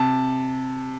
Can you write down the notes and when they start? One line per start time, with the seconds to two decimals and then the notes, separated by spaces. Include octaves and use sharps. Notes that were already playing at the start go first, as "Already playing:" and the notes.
Already playing: C3 A5